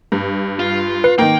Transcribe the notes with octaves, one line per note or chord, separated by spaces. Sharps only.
G2
F4
B4 C7
D#3 A#3 G5